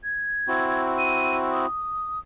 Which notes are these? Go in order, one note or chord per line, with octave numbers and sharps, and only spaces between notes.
G#6
C4 E4 F#4
D#7
D#6